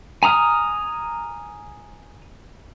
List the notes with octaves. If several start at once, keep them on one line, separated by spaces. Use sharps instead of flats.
G#5 A#5 D#6 F6